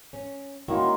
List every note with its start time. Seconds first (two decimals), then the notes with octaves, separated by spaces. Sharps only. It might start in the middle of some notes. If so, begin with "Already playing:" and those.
0.13 C#4
0.68 D#3 A#3 C#4 E4 F#4 C6